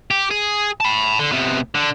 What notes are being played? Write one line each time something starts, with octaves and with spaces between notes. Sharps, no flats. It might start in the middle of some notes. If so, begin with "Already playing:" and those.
G4
G#4
A5 B5
D3
C3 B3
D3